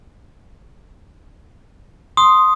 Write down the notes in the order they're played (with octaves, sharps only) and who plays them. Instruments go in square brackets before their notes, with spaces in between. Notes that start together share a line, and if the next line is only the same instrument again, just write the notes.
[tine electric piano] C6 [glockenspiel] D#6